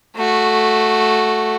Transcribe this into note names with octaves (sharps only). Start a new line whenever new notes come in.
A3 F#4